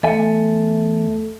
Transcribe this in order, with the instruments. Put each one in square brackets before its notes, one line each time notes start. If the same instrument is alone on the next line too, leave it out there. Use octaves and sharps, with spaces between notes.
[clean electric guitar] E2 E5 G#5 [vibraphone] A3 A4